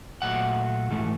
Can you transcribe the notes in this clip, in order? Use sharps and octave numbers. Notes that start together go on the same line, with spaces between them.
A#2 F#3 A3 F#5
G#2 E3 A3